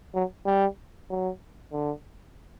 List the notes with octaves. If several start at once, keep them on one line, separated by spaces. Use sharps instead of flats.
F#3
G3
F#3
D3